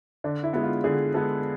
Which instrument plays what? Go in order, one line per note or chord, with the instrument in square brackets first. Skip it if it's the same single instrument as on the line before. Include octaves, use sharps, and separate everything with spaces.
[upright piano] D3 D4
E4
G#3 B3
F4
D3 G#4
G#3 B3 A4